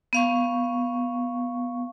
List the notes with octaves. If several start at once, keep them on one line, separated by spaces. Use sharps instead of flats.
B3 F5 C#6